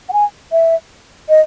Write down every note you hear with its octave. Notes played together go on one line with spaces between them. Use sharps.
F#5
G#5
E5
D#5